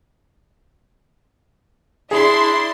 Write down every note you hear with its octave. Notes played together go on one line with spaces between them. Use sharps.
D4 E4 G#4 C6